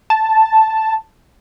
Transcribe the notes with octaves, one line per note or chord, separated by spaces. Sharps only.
A5